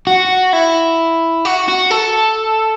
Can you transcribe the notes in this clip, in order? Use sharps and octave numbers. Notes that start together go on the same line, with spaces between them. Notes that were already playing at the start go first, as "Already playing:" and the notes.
F#4
E4
F#4
F#4
A4